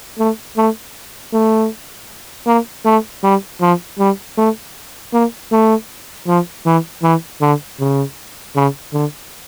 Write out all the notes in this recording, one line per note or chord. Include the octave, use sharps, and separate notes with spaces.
A3
A3
A3
A#3
A3
G3
F3
G3
A3
A#3
A3
F3
E3
E3
D3
C#3
C#3
D3